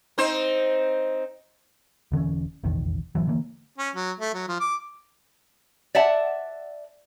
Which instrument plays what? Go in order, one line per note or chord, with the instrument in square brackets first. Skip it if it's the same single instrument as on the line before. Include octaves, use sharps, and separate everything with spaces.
[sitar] C4 D#4 C5
[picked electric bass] E1 D3 E3 C#4
F1 A#1 E2 D#3
A1 A#2 E3 F#3
D3 E3 A#3
[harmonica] C#4
F#3
A3
F#3
F3
D6
[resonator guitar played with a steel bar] D5 E5 F#5 A5